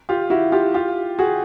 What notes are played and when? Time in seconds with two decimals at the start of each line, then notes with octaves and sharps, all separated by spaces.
0.09 F4 G4
0.30 E4 F#4
0.52 F4 G4
0.74 F4 G4
1.19 F#4 G#4